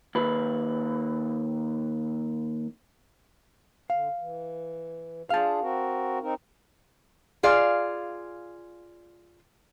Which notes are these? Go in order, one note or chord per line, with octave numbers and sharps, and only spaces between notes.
D#2 B4
D3 F5
E3
D4 F4 G#4 F5 A5
C4 F#4 A#4
C4 D#4 A#4
F4 G#4 D5 F5